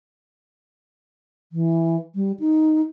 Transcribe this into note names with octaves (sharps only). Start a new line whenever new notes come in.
E3
G3
D#4